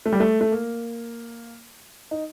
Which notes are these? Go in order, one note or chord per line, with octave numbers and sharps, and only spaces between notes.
A3
G3
A3
A3
A#3
D#4